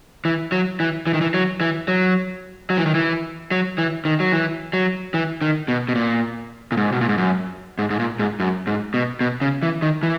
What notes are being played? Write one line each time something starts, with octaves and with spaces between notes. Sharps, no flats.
E3
F#3
E3
E3
D#3
E3
F#3
E3
F#3
F#3
E3
D#3
E3
F#3
E3
D#3
F#3
E3
F#3
E3
D#3
B2
B2
A#2
A#2
G#2
B2
A#2
G#2
F#2
G#2
G#2
A#2
G#2
F#2
G#2
B2
B2
C#3
E3
D#3
E3